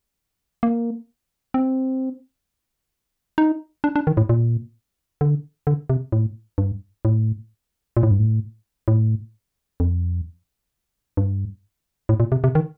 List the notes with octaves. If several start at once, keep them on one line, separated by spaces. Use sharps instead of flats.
A#3
C4
D#4
D4
D4
D#3
A2
A#2
D3
D3
C3
A2
G2
A2
A#2
A2
G2
A2
A2
F2
G2
A2
A#2
C3
C3
D#3